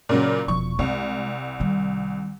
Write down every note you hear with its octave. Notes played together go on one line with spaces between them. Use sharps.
A#2 C#3 F#3
E1 F3 C#6
C2 G#3
D#3 G3